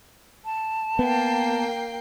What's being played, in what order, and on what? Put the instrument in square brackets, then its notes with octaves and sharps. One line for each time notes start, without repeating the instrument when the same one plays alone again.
[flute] A5
[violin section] A#3 G5 C7 [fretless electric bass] B3